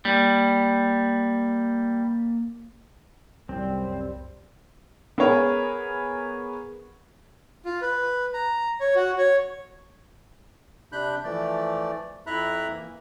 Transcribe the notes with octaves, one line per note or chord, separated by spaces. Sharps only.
G3 A#3
C2 F#2 G3 C4
B3 G#4 A#4 C#5
F4
B4
A#5
C#5
F#4
C#5
C3 D4 B5 F#6 G6
E3 F3 A3 D5
F2 E4 E5 A#5 B5 F#6
E3 A#3